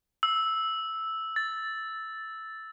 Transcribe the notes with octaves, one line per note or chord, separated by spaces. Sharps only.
E6
A6